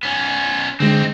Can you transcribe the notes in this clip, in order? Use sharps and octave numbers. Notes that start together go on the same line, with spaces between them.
B3 C#4
D3 G#3 C4 D#4